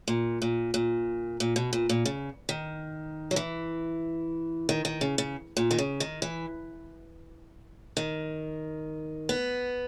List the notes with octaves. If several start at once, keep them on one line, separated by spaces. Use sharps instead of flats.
A#2
A#2
A#2
A#2
B2
A#2
A#2
C#3
D#3
F#3
E3
D#3
D#3
C#3
C#3
A#2
D#3
C#3
D#3
E3
D#3
B3